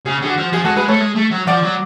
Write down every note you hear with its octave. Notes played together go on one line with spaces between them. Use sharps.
C#3 G#4
D3 G#4
F#4
F3
F3 G#4
G#3 F#4 A4
G#3 G#4 B4
A3 A4 C#5
G#3
A3
F#3
F3 D5 F#5
F#3